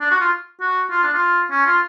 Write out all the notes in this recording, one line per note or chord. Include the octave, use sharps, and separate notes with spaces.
D4
F#4
F4
F#4
F4
D4
F4
C#4
F4